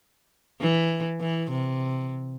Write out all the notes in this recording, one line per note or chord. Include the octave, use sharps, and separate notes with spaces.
E3
E3
C3